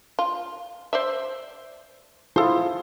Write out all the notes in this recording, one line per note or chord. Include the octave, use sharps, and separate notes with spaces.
F4
C5 D5 E5
E4 F4 G#4 A4 C5